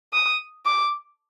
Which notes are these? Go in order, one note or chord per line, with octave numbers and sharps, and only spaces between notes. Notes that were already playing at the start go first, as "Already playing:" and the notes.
D#6
D6